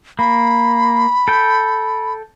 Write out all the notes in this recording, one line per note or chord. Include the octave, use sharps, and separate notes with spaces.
A#3 B5
A4 G5